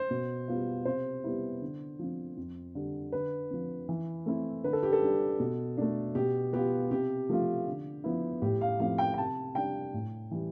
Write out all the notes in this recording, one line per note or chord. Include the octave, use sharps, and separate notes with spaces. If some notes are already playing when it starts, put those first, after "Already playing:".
Already playing: C5
B2
G3 B3 F4
C3 C5
G3 B3 E4
D3
F3 C4
F2
D3 G3
D3 B4
F3 C4
E3
A3 C4 E4
D3 B4
A4
G4
A4
G3 D4
B2
A3 D4
B2 G4
B3 F4 G4
C3 G4
F3 A3 C4 F4
D3
F3 B3 E4
A2 G4
F5
F3 A3 C4 E4 F5
G5
G5
C3 A5
G3 D4 G5
A2
E3 G3